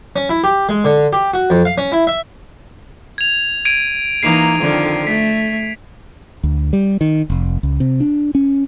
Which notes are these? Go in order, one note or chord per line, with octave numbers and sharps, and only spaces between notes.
C#4
E4
G4
G#3
D3
G4
F#4
F2
F5
C#4
E4
E5
G#6 F7
G#6 D7 D#7
E3 A#3 D#4 C7 F7
F2 D3 D#3
A3 B6
D2
G3
D#3
F1
C#2
C3
D4
C#4